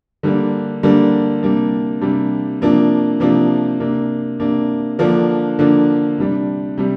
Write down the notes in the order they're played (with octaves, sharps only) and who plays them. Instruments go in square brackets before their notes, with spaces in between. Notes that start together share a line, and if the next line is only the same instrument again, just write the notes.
[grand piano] D3 G3 A#3 D4
D3 G3 A#3 D4
C3 G3 A#3 D4
C3 G3 A#3 D4
C3 F3 A#3 D4
C3 F3 A#3 D4
C3 A#3 D4
C3 A#3 D4
D3 F3 A#3 D4
D3 F3 A#3 D4
C3 G3 D4
C3 G3